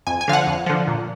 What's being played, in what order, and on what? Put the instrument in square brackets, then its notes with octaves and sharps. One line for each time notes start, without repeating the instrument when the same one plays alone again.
[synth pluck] F2 G#5
G#5
D3 F3 F5
F#5
F2
D3 F3
A#2